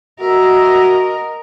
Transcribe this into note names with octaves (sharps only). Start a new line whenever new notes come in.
F#4 A#4 D#5 E5